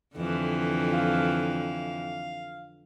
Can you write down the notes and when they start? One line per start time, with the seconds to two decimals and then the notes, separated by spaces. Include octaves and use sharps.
0.16 F2 D3 E3
0.93 F5